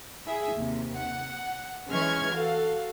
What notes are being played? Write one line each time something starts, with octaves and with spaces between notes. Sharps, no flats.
E4 G#4 E5
D#2 C3
F#5
E3 G#3 C#4 C#6 F6 G#6
F#4 A4 F5